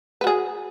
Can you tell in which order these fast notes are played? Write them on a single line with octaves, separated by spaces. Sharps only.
B4 F#4 G#4